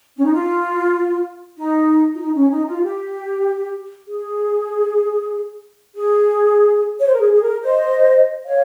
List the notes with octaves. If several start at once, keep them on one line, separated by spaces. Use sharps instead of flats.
C#4
D#4
F4
D#4
F4
D#4
C#4
D#4
F4
G4
G#4
G#4
C#5
C5
A#4
G#4
G#4
A#4
C5 D#5
C#5 F5